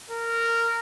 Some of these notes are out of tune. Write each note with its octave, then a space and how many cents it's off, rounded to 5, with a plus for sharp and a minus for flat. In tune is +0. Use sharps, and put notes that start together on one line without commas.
A#4 -15